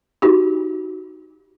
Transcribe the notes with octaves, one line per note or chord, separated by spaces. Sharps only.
D#4 F#4 G4